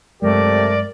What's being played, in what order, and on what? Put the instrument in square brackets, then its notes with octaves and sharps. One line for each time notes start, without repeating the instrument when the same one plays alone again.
[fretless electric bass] G2 F#3 G#3 [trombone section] C3 A3 G4 [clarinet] A#4 [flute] D5